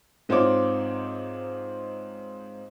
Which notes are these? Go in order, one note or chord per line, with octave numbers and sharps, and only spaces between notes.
G#2 C4 D#4 F4 C#5 D6